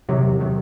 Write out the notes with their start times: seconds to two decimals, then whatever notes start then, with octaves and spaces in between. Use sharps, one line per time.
0.09 C3 D#3 F#3
0.24 E2
0.40 C3 D#3 F#3